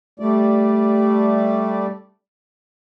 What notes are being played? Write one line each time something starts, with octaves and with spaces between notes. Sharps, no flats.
G3 A3 D5